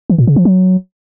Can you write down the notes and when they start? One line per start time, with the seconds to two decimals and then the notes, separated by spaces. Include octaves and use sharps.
0.10 E3
0.18 A#2
0.27 C#3
0.36 F3
0.45 F#3